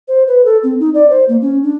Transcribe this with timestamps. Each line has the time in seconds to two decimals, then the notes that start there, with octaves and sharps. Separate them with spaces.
0.08 C5
0.28 B4
0.45 A4
0.63 C4
0.80 D#4
0.94 D5
1.10 C5
1.29 A#3
1.42 C#4
1.63 D4